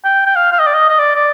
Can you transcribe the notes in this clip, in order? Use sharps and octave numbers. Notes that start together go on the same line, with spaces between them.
G5
G5
F5
F5
D#5
D5
D#5
D#5
D5
D5